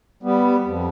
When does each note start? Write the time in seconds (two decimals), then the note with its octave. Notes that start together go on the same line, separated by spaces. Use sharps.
0.23 G3 B3
0.65 F2